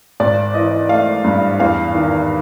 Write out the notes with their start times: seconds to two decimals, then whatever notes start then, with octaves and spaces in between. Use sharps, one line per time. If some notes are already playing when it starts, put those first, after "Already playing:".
0.20 G#1 D5
0.54 E3 D#5
0.89 A3 F5
1.24 G2
1.60 E2 F5
1.95 D#3